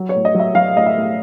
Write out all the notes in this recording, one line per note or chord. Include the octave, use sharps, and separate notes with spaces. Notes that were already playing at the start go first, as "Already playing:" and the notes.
Already playing: F#3
C#5
A2
D#5
F#3 E5
F#3 F5
A2 D#5
E5
A2